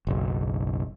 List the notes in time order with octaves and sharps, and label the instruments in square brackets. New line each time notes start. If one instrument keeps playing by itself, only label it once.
[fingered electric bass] F#1 B1